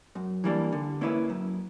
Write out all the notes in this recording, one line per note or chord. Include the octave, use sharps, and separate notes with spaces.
F#2
E3 G3 A#3 D4
D3
A#3 C#4 E4 B4
F#2